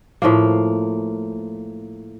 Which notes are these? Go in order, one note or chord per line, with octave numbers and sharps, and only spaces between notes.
A2 F3 A#3